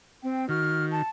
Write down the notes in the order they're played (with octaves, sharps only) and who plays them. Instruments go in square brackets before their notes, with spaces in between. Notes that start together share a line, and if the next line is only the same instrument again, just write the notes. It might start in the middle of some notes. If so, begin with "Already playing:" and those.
[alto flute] C4 [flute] G5
[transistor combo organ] D#3 [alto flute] F#4 [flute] F6
[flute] A5